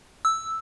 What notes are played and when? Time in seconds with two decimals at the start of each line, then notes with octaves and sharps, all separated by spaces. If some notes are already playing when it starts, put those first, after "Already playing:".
0.25 E6